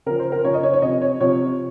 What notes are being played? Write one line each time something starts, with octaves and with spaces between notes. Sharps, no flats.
C#3 F3 A#4
C5
A#4
C#3 F3 C#5
D#5
C#5
C#5
C3 F3 D#5
C#5
C3 F3 C#5